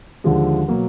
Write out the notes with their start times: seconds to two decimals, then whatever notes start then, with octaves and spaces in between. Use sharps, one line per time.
0.24 D#2 D3 F3 G#3
0.68 B2 F#3 A#3